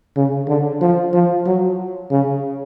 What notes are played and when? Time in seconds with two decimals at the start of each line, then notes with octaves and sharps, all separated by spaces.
0.17 C#3
0.48 D3
0.81 F3
1.14 F3
1.46 F#3
2.11 C#3